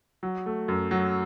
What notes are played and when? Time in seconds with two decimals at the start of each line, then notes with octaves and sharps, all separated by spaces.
0.23 F#3
0.46 A3
0.68 F#2
0.91 F#3